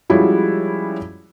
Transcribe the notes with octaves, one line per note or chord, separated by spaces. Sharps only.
F3 G3 G#3 C#4 E4 F#4